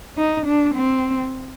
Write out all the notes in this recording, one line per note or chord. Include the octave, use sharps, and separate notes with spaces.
D#4
D4
C4